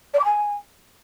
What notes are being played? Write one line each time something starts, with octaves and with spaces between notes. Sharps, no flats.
D5
D6
G#5